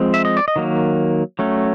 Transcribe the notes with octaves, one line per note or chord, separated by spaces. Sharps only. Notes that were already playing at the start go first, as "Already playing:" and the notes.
Already playing: F3 G#3 C4
E5
D#5
D5
D#5
D#3 F#3 A#3
F#3 A3 C#4